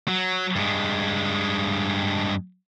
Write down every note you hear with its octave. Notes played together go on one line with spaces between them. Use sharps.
F#3
G2 G#3